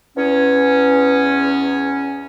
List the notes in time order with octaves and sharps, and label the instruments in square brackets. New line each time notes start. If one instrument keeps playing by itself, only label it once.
[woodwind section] E2 C#4